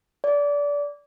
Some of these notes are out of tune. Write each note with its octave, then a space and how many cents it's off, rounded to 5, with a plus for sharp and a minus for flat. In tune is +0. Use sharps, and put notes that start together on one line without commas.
D5 -25